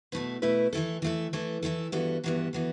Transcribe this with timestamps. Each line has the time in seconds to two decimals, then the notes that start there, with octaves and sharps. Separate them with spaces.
0.12 B2 A3 E4 B4
0.42 B2 A3 E4 B4
0.73 E3 A3 E4 A4
1.02 E3 A3 E4 A4
1.33 E3 A3 E4 A4
1.63 E3 A3 E4 A4
1.92 G2 E3 B3 F#4 A4
2.24 G2 E3 B3 F#4 A4
2.53 E3 B3 F#4 A4